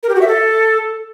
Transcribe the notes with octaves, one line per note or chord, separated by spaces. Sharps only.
A#4
G4
F#4
E5
A4